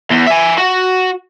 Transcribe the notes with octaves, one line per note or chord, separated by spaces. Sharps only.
E2
E5 G#5
F#4